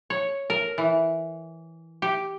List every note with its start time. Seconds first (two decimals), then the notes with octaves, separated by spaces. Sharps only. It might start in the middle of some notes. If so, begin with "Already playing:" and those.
0.10 C#5
0.50 A#4
0.78 E3
2.02 G4